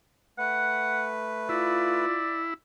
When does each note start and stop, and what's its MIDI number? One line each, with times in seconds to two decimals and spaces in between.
0.38 2.05 57
0.38 2.05 71
0.38 1.07 78
1.49 2.54 64
1.49 2.20 65
1.49 2.40 74